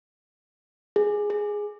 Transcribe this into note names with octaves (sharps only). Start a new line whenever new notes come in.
G#4
G#4